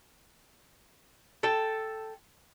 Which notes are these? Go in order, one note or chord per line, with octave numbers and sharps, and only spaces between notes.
A4 G5 A5